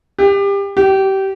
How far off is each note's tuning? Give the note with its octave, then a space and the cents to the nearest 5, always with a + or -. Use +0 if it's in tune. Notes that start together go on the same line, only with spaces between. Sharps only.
G4 +25
G4 -25